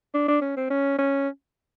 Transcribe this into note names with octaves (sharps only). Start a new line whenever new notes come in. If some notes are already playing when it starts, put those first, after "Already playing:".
D4
D4
C#4
C4
C#4
C#4